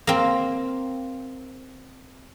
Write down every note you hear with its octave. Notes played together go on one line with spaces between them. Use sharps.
A#3 C4